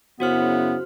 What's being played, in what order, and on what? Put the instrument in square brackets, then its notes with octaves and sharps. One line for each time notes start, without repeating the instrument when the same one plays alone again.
[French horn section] F#2 C#3 E4 [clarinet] B3 [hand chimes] F#4 C5 F6